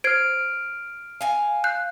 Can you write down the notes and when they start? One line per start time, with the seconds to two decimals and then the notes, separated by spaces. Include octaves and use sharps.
0.04 C5 F6 G#6 C7 D7
1.21 F5 G#5
1.64 F#6 G6 C7